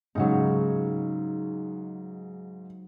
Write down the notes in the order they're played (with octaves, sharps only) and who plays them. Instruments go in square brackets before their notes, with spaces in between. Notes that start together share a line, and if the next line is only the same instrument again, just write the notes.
[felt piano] G#2 C#3 [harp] F#3 D#4